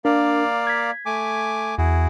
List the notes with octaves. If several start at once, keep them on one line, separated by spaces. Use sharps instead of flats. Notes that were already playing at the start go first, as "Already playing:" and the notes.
A#3 D4 A#4 D5 F5
G#6 B6
A3 G#5 D6
E2 E4 F#4 G#4